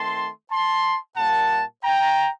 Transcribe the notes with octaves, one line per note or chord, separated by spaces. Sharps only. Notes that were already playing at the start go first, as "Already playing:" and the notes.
Already playing: D#3 A3 C4 A5 C6
A5 C6
A#2 G3 A#3 F#5 A5
G5 A#5